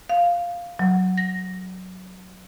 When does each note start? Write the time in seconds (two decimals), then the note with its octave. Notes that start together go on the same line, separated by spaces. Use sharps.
0.09 F5
0.79 F#3
1.18 A#6